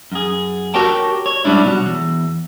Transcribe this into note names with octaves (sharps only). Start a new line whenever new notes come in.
F#2 G#4
F#4 G4 A#4 C#5 G5 A5
C#5
G#2 G3 C#4 D4 E4
B2 F#3
E2